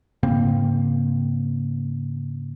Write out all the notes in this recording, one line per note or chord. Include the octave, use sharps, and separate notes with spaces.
G#2 C#3 A#3 C4